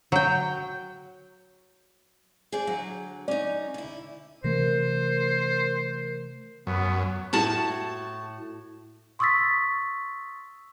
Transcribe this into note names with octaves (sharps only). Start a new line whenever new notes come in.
F#3 G5
G#4 C5 D5
D3 F#3
C#4 D#4 D5
D3 E4
C3 E3 A3 A#4 C5
F#2 B3
A2 F#4 A5
C6 C#6 D#6 E6 A6 B6